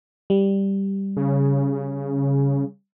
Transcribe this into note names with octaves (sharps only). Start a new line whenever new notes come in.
G3
C#3